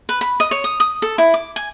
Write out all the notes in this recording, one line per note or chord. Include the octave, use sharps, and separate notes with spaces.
B4
B5
D#5
C#5
D#6
D#6
A4
E4
D6
G#5